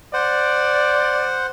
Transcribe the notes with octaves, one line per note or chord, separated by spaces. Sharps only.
C5 D5 F#5